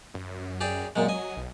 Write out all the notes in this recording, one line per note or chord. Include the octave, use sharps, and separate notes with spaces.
F#2
G4 G#4 D5
F#2 A#2 F#3 G#3
D#5 G#5
B1